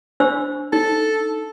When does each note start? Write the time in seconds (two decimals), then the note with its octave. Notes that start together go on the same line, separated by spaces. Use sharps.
0.20 D4 C5 E6
0.73 D#4 A4